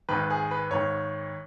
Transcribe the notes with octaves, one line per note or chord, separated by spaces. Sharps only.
G#1 G#2 D#3 B4
G#4
B4
G#1 G#2 D#3 C#5